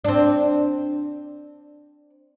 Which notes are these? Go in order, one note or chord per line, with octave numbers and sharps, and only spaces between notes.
C4 D4